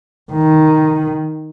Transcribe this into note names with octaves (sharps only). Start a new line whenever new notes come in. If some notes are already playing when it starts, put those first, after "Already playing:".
D#3